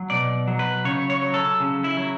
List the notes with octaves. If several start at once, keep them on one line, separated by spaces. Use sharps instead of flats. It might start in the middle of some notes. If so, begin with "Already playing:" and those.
Already playing: F#3
B2 D5
F#3
B4
C#3 C#5
C#5
F#3
A4
C#3
E4
F#3